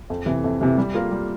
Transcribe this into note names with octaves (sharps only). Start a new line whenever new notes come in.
F2
C3 E3
F2
C3 E3
G3
A#3 F4 A#4
G3